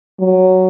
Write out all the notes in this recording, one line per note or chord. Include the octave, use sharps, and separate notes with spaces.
F#3